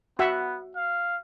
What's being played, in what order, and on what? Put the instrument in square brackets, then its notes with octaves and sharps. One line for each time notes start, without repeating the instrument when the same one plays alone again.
[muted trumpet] B3 [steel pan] F#4 E5 F#5
[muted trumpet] F5